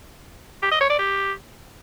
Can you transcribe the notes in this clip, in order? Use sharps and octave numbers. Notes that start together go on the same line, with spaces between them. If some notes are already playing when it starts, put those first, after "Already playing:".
G4
D#5
C#5
D5
G4